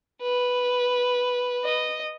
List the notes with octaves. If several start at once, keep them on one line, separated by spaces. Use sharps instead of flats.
B4
D#5